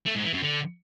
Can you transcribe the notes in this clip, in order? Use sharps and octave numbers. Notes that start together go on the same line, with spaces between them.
A3
G#2
E3
F#2
D3